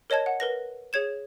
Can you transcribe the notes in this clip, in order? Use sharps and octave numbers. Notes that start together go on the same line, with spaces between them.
A#4 C#5 D#5 A5 G#6
F#5
A#4 B4 A#6
G#4 C#5 G#6 E7